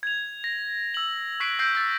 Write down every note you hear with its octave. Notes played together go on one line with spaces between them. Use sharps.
G#6 F7
A#6
E6 F#7
C#6 F#6 B6 C7 D7
E6 G6 A#6 C7 D7
E6 A6